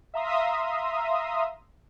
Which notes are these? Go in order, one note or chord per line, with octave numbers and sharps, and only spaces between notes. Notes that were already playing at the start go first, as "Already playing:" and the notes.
E5 F5 A#5 C6 D#6